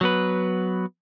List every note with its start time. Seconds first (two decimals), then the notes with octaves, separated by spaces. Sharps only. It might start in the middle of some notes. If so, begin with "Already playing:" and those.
0.01 F#3 B3 B4